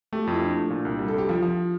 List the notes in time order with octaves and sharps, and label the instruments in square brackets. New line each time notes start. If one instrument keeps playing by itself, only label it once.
[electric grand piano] A3 [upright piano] G4
[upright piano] F4
[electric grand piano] F2 [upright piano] E4
[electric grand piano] F3 [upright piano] D4
[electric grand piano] A3
A#2
C2
G3
[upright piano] A4
[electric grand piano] C2 [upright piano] G4
[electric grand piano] F3 [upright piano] F4
[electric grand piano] F3